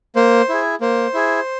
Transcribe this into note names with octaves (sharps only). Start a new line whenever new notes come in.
A#3 C5
E4 G#4
A#3 C5
E4 G#4